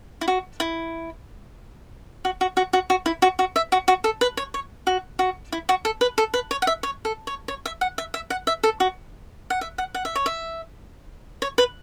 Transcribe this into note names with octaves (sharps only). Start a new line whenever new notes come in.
E4
F#4
E4
F#4
F#4
F#4
F#4
F#4
E4
F#4
F#4
E5
F#4
F#4
A4
B4
C#5
C#5
F#4
F#4
E4
F#4
A4
B4
A4
B4
C#5
F#5
E5
C#5
A4
C#5
C#5
E5
F#5
E5
E5
F#5
E5
A4
F#4
F#5
E5
F#5
F#5
E5
C#5
E5
C#5
B4